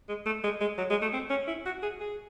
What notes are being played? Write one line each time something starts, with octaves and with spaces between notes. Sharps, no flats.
G#3
A3
G#3
G#3
F#3
G#3
A3
C4
C#4
E4
F#4
G#4
G#4